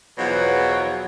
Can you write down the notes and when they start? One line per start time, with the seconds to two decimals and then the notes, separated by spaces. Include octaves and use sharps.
0.18 E2 B2 F3 F#3